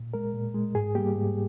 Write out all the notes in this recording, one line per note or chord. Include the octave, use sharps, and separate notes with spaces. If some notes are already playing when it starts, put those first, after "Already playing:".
Already playing: A#2
G#3 A#4
A#2
G#3
G#2 G#4
G3 A#3 G4
G#2